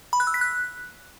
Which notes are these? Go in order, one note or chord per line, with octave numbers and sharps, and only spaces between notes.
B5
F#6
E6
B6
F#6